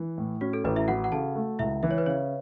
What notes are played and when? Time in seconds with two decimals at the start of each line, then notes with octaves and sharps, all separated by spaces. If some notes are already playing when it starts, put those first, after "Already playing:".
Already playing: E3
0.18 A2
0.41 C#4 F#4
0.53 A4
0.64 A1 B4
0.76 E4 E5
0.88 E3 F#4 F#5
1.04 F#5
1.12 C#3 A4 A5
1.35 A3
1.59 C#2 E4 E5
1.83 E3 E5
1.91 C#5
1.98 B4
2.06 C#3 C#5